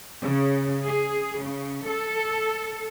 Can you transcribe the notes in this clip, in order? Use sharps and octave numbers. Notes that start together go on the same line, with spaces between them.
C#3
G#4
C#3
A4